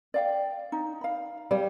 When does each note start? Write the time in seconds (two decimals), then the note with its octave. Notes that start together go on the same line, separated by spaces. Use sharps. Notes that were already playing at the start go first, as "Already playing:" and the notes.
0.14 D5 F5 G5
0.72 D#4
1.01 F5 B5
1.51 G3 G4 C#5 F5